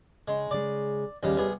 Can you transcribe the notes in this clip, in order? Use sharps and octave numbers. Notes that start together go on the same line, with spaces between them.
C#3 G#3
C#3 G#3 D5
D#2 C#3 G3 C#5 D#5
C2 B3 G#4